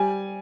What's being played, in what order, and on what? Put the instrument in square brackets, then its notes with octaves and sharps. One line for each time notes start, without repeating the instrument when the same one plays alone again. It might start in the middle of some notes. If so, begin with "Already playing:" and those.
Already playing: [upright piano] G3 G#5